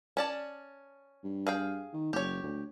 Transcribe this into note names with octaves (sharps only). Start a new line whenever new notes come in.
C#4 D5 A5
G2
G#4 F5 G5
D#3
F#1 G4 C#5
D2